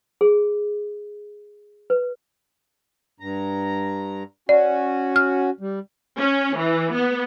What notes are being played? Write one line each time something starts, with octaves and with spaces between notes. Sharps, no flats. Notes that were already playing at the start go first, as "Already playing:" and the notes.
G#4
B4
G2 A#5
C#4 F#4 D5
F6
G3
C#4
E3
B3